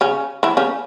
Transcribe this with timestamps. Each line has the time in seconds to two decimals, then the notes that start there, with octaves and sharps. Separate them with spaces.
0.01 C#3 C#4
0.43 E3 E4
0.57 C#3 C#4